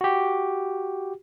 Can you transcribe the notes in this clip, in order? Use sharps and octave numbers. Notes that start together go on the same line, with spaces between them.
F#4 G4